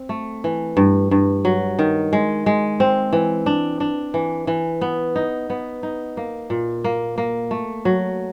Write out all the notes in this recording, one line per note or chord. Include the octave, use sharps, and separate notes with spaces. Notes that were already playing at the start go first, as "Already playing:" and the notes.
Already playing: C4
A3
E3
G2
G2
F#3
D#3
G#3
G#3
C4
E3
D4
D4
E3
E3
B3
D#4
B3
D#4
A#3
A#2
A#3
A#3
A3
F#3